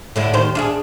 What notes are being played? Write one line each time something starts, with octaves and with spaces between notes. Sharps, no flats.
A2 D3 E4
D#2 D#3 C5
D4 F4 G#4